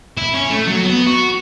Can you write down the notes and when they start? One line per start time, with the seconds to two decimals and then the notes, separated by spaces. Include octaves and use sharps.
0.17 E4
0.34 C#4
0.50 A3
0.67 F#3
0.84 B3
1.06 F#4